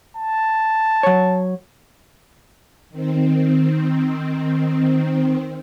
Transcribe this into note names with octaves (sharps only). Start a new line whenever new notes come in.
A5
F#3 C#5
D#3 C4